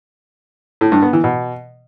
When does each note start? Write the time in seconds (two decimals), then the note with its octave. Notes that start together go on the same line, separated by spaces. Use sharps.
0.81 A2
0.92 G2
1.02 B3
1.13 E3
1.24 B2